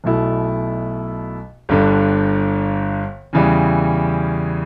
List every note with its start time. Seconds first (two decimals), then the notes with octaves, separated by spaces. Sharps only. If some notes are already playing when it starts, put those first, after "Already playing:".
0.04 B1 B2 A3 E4
1.69 G1 G2 D3
3.33 E2 C#3 E3 G3